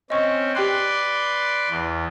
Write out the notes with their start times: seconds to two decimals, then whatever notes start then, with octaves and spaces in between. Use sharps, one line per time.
0.10 C4 C#4 D#5 C#6
0.55 G4 B4 D5 G5 C6 F#6
1.70 E2